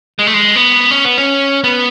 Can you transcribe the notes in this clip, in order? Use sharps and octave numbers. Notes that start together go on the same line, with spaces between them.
G#3
A3
G#3
B3
C#4
B3
C#4
B3